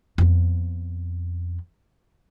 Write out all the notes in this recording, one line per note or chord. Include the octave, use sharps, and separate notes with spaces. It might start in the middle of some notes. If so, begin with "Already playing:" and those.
F2 B3